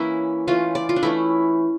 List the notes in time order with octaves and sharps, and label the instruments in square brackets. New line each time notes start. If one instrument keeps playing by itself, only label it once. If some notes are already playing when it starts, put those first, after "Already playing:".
Already playing: [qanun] E3 A#3 C#4 E4
E3 A3 C#4 F4
D5
F4
D4
E3 A3 C#4 E4